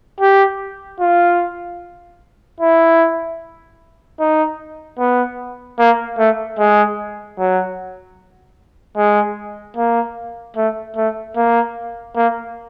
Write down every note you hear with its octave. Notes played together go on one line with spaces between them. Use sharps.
G4
F4
E4
D#4
B3
A#3
A3
G#3
F#3
G#3
A#3
A3
A3
A#3
A#3